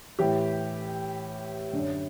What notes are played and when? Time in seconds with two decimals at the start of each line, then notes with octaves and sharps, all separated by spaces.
0.19 A2 E3 G4
1.73 F#2 D3